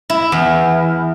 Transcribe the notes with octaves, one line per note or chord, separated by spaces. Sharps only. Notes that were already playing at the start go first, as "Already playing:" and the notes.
E4
E2